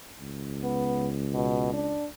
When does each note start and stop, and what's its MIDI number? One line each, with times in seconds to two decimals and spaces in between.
0.21 2.05 37
0.63 1.12 59
1.34 1.73 47
1.73 2.07 62